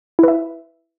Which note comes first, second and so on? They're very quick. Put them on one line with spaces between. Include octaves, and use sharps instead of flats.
E4 B4 E5